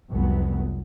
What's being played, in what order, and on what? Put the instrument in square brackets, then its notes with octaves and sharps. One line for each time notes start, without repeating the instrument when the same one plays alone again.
[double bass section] F1 C2 F#3 B3